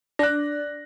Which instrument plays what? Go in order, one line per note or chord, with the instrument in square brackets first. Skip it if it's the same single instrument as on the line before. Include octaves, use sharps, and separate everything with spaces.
[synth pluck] D4 [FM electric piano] D5 [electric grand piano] F#6 A#6